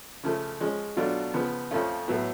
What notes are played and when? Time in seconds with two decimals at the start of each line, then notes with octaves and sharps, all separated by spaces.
0.23 C#3 F3 A3
0.60 F3 G#3 C#4
0.97 B2 F#3 A3 D4 F4
1.34 C#3 F3 B3
1.71 F2 F3 A3 C#4 F4
2.08 A2 F#3 B3